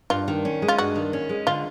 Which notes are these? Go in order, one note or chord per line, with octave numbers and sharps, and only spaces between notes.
G2 F4
D#3
C#4
G#3
F4
G2 F#4
D#3
C#4
G#3
D3 F4